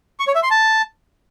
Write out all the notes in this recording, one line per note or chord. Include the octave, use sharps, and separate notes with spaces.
C#6
C#5
E5
C6
A5